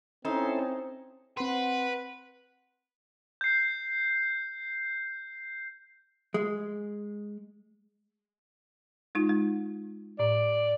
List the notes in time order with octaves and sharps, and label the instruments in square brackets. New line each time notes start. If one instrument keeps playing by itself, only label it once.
[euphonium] C4 [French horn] C#4 [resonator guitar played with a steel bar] D#4 [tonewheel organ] E4 A4 C5
[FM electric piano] C4 C6 [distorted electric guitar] B4 [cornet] F#5
[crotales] G6 C7
[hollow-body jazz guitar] G#3
[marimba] G#3 D#4 F4
G#3
[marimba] A2 [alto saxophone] D5